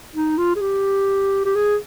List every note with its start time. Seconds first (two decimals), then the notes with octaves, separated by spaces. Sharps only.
0.15 D#4
0.38 F4
0.56 G#4
0.61 G4
1.45 G4
1.55 G#4